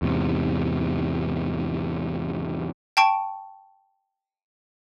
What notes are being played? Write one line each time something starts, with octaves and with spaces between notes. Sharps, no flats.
E2 G#2 C3
G5 A5 C#6 D7